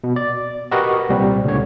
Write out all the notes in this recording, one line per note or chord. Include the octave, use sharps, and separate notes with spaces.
B2
D5
F#4 G4 A#4 B4 D#5
C2 A#2 G3 C4
C#2 A#2 D3 C#5